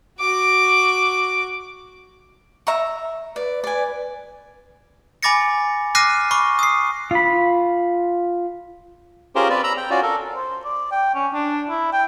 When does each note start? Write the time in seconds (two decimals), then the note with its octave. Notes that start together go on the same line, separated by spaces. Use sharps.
0.19 F#4 D6
2.67 E5 A#5 C#6
3.36 B4 D5
3.64 D5 G#5
5.23 G#5 B5 D6 A6 A#6 C#7
5.95 D6 F6 F#6 A#6 C7 D#7
6.31 B5 C#6 D6
6.59 D#6 C7
7.11 F4 B5
9.35 C#4 F4 G4 G#4 A#4 C5
9.50 C4 B4 D5
9.64 A#5 B5 E6
9.77 G5
9.90 C#4 F4 F#4 D5
10.03 A4 A#4
10.35 C5
10.65 D5
10.92 G5
11.15 C#4
11.34 D4
11.69 E4
11.93 G5